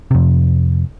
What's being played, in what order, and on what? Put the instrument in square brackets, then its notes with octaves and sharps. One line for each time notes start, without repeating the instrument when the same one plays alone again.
[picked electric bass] F2 C3